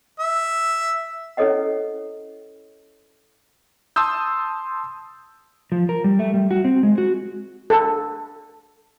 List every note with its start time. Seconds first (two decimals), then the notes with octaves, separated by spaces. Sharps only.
0.19 E5
1.37 C#4 E4 A4 C#5 D#5 F#5
3.96 A5 C6 D#6 E6 G6
5.72 F3
5.89 A#4
6.04 G3
6.19 A3
6.34 G3
6.51 F#4
6.65 C4
6.83 G#3
6.98 F#4
7.70 A4